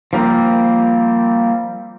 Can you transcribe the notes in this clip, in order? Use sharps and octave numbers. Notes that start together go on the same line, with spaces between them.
F3 G3 A#3 C4